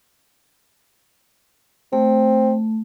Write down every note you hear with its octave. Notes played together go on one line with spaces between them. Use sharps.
A3 C4